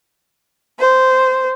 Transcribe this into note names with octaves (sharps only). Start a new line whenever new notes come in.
C5